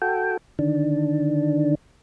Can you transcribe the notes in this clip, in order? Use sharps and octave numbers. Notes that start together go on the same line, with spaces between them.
F#4 A4 G5
D3 D#3 D4